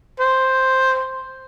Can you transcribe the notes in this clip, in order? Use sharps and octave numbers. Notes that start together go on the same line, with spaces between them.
C5